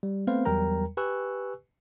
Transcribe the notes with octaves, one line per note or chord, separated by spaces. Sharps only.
G3
A3 B3 C4 B4 C5 F5
E2 F#3 G3 A#4 G5 A#5
G4 B4 G#5 C#6 E6 F#6